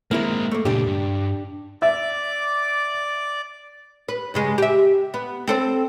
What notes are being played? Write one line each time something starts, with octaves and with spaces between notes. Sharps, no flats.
G#3 A#3 C4 E4 A#4
A3 A#3
C#2 A#2 D4 G4
G2
D5 E5 D6
B4
G2 C#3 G#3
G4 E5
B3
C4 A4 C5